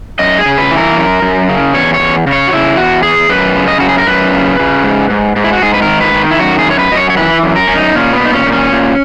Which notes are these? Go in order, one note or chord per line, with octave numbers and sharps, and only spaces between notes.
F#2 D#5
G#4
C#3
B4
E3
A#4
F#2
F#2
C#3
E2 C#5
C#5
E2
C#3
C#5
F#4
C#3 E4
E2 F#4
E2 G#4
F#2 B4
C#3
D#5
F#2 F#4
G#4
A#4
F#2 B4
C#3
C#3
G#2
G#2
G#2
E4
F#4
G#2 G#4
B4
A#4
D#3
B4
D#3
E4
F#2 F#4
G#4
F#2
C#5
B4
F#2 D#5
C#5
C#5
E3 B4
F#2
A#4
F#2 C#4
D#4
A#2 C#4
B3
A#2
D#4
C#4
A#2
C#4
A#2